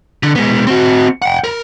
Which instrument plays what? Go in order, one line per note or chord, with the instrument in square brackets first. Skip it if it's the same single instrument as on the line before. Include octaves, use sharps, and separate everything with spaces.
[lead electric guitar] D3
G#3 B3
C4 F#4
F#5 G5
A#4